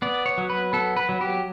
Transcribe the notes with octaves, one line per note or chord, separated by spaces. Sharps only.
B3 D5
C#5
F#3
B4
B3 A4
B4
F#3
G4